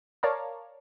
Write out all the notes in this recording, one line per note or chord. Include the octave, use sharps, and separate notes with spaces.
A#4 C#5 D5 F5 A5 A#5